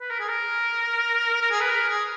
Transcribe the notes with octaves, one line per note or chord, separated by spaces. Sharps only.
B4
A#4
G#4
A#4
A#4
G#4
B4
A#4
G#4